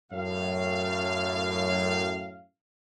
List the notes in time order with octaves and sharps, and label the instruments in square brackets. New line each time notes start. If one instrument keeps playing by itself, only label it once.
[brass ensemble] F#2 A2 F5